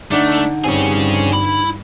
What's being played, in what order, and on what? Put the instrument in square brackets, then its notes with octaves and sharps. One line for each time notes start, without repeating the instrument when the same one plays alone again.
[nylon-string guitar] D3 D#4 F#5 [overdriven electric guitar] A3 [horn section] D4
[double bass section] G2 [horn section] F3 G3 C4 [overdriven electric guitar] C#4 G#4
[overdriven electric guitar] E4 B5